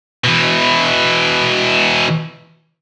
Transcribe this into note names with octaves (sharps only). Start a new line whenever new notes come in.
B2 E3